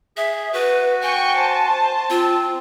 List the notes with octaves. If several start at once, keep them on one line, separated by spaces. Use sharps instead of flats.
G#4 E5
F#4 B4
G5 G#5 C#6
C5 A5
C4 F4